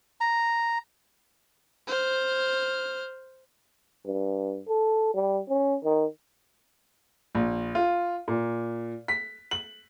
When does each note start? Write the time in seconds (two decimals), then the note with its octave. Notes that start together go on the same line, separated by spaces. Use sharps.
0.21 A#5
1.88 C5 F6
4.06 G2
4.68 A4
5.14 G3
5.49 C#4
5.84 D#3
7.35 A#1
7.75 F4
8.28 A#2
9.08 B6
9.51 F#7